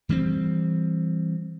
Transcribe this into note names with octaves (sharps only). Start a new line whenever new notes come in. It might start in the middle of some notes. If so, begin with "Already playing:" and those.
E3 G3 A#3 C4